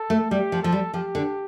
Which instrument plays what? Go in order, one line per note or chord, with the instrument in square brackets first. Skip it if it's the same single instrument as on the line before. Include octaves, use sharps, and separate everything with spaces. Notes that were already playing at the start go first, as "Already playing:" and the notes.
Already playing: [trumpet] A4
[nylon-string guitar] A3
[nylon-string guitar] G3 [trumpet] G4
[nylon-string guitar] F3
[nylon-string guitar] F3 [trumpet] A4
[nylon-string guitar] G3
[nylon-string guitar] F3 [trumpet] G4
[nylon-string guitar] D3